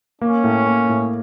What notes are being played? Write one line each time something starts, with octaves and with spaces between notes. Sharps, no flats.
A#3 C#4
A2
A#3
A2